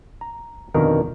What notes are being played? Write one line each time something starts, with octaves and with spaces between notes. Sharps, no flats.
A#5
F2 B2 D3 D#3 D#4 A#4